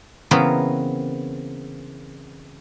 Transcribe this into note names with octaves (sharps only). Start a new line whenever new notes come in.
C#3 E3 B3 C4 A#4 C#5